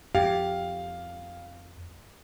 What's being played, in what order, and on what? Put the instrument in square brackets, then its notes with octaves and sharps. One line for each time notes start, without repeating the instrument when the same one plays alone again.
[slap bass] F2 [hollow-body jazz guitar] G4 [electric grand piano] F5